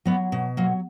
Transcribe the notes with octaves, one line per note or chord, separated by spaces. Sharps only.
F#3 B3
B2
F#3 A#3